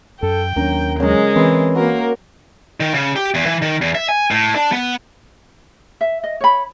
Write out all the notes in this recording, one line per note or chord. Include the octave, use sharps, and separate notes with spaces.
F#2 A4 G5
D#2 F#3 C#4 D4 A#4
C#3 F#3 G#3 A#4
E3 C4 C6
A#3 F#4 A#4
D#3
C#3
G4
E2
E3
D#3
E2
E5
G#5
A2
D4
B3
E5
D#5
C#5 B5